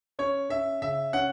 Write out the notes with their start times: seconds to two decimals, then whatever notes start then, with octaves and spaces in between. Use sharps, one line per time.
0.19 C#4 C#5
0.49 C#4 E5
0.82 C#3 E5
1.13 C#4 F#5